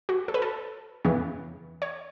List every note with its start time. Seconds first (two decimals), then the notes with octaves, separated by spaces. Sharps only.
0.09 F#4
0.28 A4
0.34 B4
0.42 A4
1.05 E2 C#3 E3 B3
1.82 C#5